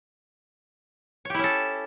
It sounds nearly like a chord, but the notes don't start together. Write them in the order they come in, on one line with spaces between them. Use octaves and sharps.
C#5 G4 E4 C#4 A4